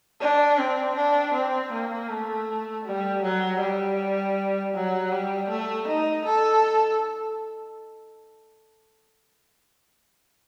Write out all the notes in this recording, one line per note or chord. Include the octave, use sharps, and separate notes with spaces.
D4
C4
D4
C4
A#3
A3
G3
F#3
G3
F#3
G3
A3
D#4
A4